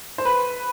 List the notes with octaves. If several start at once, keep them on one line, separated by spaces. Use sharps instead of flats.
C5
B4